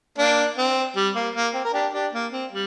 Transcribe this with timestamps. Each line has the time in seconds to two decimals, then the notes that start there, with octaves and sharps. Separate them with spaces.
0.18 A#3 D4
0.58 C4
0.96 G3
1.16 A#3
1.35 A#3
1.54 C4
1.65 A#4
1.73 D4 G4
1.93 D4 G4
2.13 A#3
2.32 C4
2.52 G3